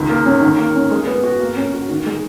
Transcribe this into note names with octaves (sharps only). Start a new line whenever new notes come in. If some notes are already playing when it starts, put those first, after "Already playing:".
Already playing: C#2 D#3
A#3
C#4
D#3
A#3
C#4
G#3
B3
F#4
A#3
C#4
F#4
D#3
G#3